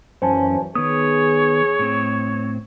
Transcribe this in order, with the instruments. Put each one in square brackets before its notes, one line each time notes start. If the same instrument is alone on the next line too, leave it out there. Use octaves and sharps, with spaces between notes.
[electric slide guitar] F#2 C#4 [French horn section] D#3 E3 F#3 [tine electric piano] C5 G#5 A5
[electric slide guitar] D#3 B3 [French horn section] G#4 [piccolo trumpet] C#5 [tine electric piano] D#6
[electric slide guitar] A2 C4